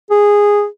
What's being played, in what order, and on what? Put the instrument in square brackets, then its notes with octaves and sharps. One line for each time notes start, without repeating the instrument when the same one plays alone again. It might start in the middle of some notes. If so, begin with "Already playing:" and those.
[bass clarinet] G#4